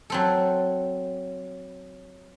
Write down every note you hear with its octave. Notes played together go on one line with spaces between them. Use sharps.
F#3 C4 A4